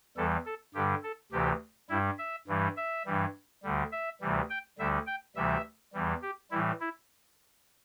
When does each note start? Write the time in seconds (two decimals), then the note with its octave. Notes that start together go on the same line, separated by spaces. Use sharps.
0.17 E2 E3 G3 A4
0.46 A4
0.74 G2 D3 G3 G4
1.03 A4
1.32 D2 C3 E3 G4
1.90 G2 G3 E4
2.18 E5
2.47 G2 E3 G3
2.76 E5
3.06 G2 E3 G3
3.63 D2 D3 G3
3.92 E5
4.21 D2 C3 E3 G3
4.50 G5
4.78 D2 D3 G3 E5
5.07 G5
5.36 D2 C3 E3 G3 E5
5.93 E2 E3 G3
6.22 G4
6.51 A2 E3 G3 E4
6.81 E4